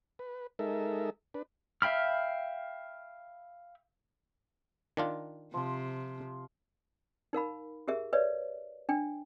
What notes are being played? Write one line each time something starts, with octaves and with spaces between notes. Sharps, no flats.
B4
G#3 D#4 A4 A#4 E5
D4 B4
E5 F5 G5 B5 F6
D#3 D4 F4
C3 F3 C6
D#4 A#4 F5 B5
G4 G#4 A#4 E5
B4 C#5 D5 E5
D4 G5